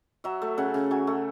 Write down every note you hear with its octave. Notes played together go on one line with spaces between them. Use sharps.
F#3 E5
A3
C#3 F#5
C#3
F#3 G#5
A3